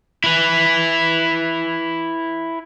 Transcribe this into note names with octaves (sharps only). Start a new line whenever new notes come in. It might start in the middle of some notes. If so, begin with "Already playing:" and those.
E4 B4